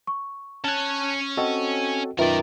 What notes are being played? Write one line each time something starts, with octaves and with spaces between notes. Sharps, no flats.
C#6
C#4 C#5 A5 F#6
C4 F#4 A4 D#5 G5
F#2 D#3 F4 A#4 B4 D5 E5